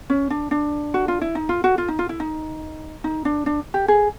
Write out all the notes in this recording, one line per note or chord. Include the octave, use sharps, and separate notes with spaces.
C#4
D4
D4
F#4
F4
E4
D#4
F4
F#4
F4
D#4
F4
E4
D#4
D#4
D4
D4
G4
G#4